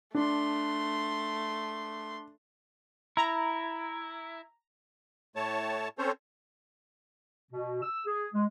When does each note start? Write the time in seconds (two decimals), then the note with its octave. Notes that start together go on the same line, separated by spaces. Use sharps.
0.15 A3 D4 C6
3.17 E4 A#5
5.36 A2 A3 C#5 A5
5.98 C4 C#4 A4 C5 C#5
7.52 B2
7.82 E6
8.06 G#4
8.34 G#3